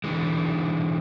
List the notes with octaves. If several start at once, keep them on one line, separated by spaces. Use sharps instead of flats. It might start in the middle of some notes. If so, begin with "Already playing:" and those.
D3 E3 G#3